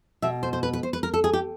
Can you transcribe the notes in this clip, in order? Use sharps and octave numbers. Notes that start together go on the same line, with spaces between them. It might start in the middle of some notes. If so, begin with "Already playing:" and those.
B2 E5
C5
C5
B4
B4
C5
B4
A#4
A4
G#4
G4